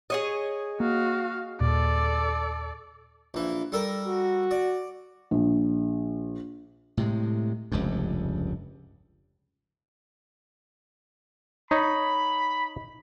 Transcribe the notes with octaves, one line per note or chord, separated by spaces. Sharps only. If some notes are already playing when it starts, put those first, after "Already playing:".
G#4 C#5 D#5
A#3 F#4 F5
D#2 A#2 A4 D5
A#1 E3
G3 A4 A#4
F#4
D5
A#1
A2 C3 G#3
F1 C#2 G2
D#4 C#5 B5